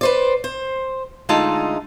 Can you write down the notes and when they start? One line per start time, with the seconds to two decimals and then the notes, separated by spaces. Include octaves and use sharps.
0.01 B4 C5 D5
0.44 C5
1.29 D3 G#3 A3 D#4 F4 A5